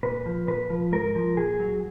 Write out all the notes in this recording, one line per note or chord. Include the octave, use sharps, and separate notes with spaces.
A#2 B4
F3
A#2 B4
F3
G#2 A#4
F3
A#2 G#4
F#3